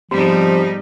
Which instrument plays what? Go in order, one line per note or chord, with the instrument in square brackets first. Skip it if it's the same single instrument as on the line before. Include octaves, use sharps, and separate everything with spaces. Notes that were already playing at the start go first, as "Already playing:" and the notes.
[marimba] G#2 B3 [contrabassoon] C3 [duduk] F3 [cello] G3 D#4